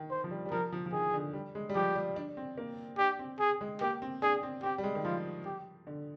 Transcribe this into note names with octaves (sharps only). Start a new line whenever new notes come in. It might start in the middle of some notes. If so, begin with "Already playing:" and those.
Already playing: D#3
C5
F3
G3
G3
F3 A#4
F3
F3
D#3 G#4
D3
G3
G#3
G3
F3 G4
G3
D4
C4
A#3
D4 G4
C4
G#4
G#3
A#3 G4
C4
D4 G#4
C4
C4 G4
G3
G#3
D#3
F3 F4
G4
D3